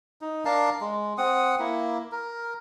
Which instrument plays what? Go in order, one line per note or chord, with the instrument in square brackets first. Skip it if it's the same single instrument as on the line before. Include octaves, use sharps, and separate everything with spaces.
[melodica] D#4
D4 A#4 F5 A5
G#3
C4 F#5 D#6
A#3 E4
A#4